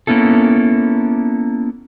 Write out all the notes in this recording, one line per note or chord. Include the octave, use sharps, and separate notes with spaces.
A#3 B3 C#4 E4 A4